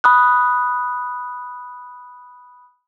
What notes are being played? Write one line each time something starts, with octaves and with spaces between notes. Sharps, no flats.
B5 D#6 F#6